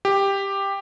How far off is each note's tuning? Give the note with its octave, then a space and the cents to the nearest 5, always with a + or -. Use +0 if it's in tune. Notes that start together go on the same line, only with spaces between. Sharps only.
G4 +10